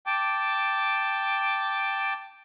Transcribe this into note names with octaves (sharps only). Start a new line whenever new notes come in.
G5 A5 D6